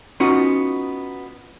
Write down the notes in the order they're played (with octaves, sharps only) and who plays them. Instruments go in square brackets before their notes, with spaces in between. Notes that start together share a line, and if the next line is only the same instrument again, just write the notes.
[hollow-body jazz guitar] B3 C#4 D#4 F4 F#4